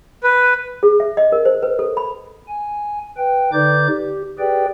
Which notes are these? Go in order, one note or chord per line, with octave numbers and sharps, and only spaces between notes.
B4
G#4
E5
D#5
A#4
C5
B4
A4
B5
G#5
B4 G5
D3 D#4 B4 D5 D6 G6
G4
G4 G#4 B4 D5 G5